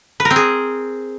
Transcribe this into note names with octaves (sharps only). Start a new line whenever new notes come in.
B4
A#4
C4
G#4